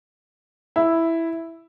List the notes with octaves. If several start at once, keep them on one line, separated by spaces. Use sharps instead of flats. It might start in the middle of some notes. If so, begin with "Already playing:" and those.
E4